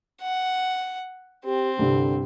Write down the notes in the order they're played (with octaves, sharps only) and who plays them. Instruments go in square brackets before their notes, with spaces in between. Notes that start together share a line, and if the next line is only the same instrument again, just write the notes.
[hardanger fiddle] F#5
[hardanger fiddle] C4 [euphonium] G4
[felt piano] C2 G2 [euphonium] D3